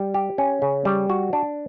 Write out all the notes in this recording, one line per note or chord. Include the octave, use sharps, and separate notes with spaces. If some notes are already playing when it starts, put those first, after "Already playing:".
Already playing: G3
G4
C#4
C#3
G3
F#4
D4